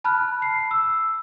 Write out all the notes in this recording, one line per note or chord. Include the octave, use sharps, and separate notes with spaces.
A5 B5 F6 F#6
C7
E6